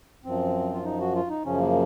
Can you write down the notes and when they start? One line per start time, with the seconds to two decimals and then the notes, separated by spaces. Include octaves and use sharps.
0.25 F#2 F3 C4
0.74 F4
0.85 D#4
1.00 F#4
1.15 F4
1.30 D#4
1.45 F#2 C#3 F3 C#4
1.60 A#3